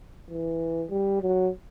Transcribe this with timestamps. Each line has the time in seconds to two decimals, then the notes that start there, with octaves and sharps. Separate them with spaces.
0.30 E3
0.90 G3
1.21 F#3